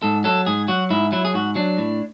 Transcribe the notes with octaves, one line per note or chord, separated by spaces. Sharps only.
G#2 A4
F#3 A4
G#2 G#4
F#3 F#4
G#2 E4
F#3 E4
G#4
G#2 F#4
F#3 D4
A2